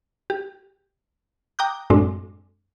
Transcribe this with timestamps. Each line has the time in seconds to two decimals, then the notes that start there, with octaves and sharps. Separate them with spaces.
0.30 G4
1.59 G5 A#5 D6 D#6 F#6 G6
1.90 F#2 A2 G#3 C4 D4